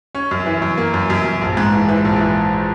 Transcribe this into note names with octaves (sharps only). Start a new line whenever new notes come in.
C#4
F#2
E3
F#2
A#3
F#2
F#2
F#2
A#1
G#2
E3
E3
A#1
E3